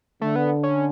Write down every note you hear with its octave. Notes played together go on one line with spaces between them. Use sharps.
D3 A3
B3
C#4